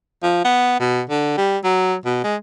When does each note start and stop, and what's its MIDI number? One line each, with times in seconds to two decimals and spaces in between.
0.23 0.44 53
0.45 0.80 59
0.80 1.02 47
1.10 1.38 50
1.38 1.58 55
1.64 1.96 54
2.06 2.21 47
2.24 2.36 56